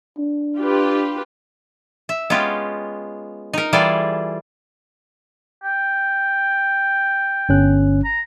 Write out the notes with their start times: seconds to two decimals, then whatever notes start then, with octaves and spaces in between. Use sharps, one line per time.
0.18 D4
0.58 F4 G4 B4
2.09 E5
2.30 G#3 B3 C#4 F4 G4
3.53 D#4 A#4
3.73 E3 G3 F4 G#4 A4 D5
5.64 G5
7.49 G1 C#4 F#6
8.04 A#5